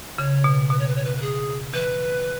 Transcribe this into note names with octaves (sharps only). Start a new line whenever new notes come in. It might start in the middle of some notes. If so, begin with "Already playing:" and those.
C#3 C#5
B2
B2 B4
C#5
B4
C#5
B4
B4
G#4
E3 B4